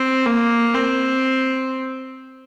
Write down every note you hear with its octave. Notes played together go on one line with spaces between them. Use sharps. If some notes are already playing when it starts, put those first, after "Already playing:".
Already playing: C4
A#3
C4